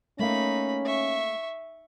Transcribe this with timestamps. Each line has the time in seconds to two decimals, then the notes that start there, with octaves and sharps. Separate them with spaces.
0.19 A3 A#3 C#4 D#4 F5 B5
0.85 E5 C#6